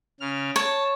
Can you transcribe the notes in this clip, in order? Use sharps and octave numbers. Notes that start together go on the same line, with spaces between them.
C#3 F6
C#5 A5